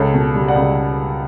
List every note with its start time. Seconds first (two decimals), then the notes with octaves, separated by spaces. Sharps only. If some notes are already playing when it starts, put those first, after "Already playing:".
Already playing: C#2 A4 C#5
0.14 B2
0.35 G3
0.48 D5 F#5
0.56 C#2